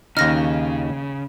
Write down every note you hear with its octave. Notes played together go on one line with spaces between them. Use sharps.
D#2 C#3 D#4 F6 A#6